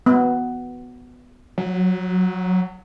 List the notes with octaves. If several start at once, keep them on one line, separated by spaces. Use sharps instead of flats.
B3
F#3